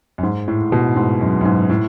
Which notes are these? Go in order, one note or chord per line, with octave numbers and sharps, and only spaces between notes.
F#2
G#2
A2
B2
G#2
F#2
F#2
G#2
A2